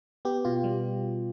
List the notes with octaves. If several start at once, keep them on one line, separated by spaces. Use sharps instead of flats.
B3 G4
B2 F4
G3